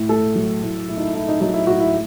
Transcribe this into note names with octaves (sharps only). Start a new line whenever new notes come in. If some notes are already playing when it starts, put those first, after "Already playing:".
Already playing: A2
A3 A4
F#3
A2
A2 E4
D#4
E4
A3 E4
D#4
F#3 D#4
E4
A2 F#4
E4